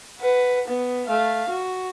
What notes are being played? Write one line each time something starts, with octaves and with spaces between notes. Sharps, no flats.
B4 F#5
B3
A3 F5
F#4